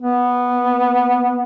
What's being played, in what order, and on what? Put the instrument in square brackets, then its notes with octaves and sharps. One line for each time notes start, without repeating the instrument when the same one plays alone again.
[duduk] B3